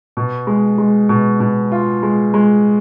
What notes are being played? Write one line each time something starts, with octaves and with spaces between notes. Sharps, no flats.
B2
G#3
G#3
B2
B2
F4
G#3
G#3